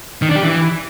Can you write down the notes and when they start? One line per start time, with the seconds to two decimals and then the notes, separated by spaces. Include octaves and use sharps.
0.22 D#3
0.29 D4
0.36 G4
0.43 E3